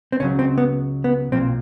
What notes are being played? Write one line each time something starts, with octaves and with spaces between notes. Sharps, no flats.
C4
C#2 C#3 F#3 C#4
C4
B3
B3
B1 A#2 F3 C4